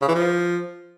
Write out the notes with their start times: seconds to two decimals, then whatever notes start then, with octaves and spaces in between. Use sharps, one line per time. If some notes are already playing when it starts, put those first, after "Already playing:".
0.02 C#3
0.08 E3
0.15 F3